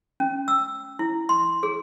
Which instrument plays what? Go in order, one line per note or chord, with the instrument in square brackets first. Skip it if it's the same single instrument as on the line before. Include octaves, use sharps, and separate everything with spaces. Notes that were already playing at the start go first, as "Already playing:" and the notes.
[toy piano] C#4
E6
E4
C6
G#4